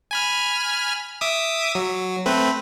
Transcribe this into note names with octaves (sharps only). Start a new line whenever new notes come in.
G#5 B5 F6
E5 D6 D#6
F#3
A3 C4 B4